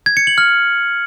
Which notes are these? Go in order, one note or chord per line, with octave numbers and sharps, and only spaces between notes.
G#6
C#7
F#7
F6